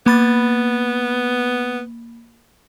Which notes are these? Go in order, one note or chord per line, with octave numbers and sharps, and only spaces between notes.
A#3 B3 B5 A6